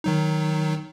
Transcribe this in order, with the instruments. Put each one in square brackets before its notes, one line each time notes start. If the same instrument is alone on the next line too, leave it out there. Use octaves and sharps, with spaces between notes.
[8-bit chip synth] D#3 F#3 D#4